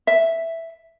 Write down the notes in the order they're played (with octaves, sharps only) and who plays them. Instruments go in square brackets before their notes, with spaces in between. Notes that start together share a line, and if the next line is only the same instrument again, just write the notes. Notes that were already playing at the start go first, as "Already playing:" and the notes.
[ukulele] E5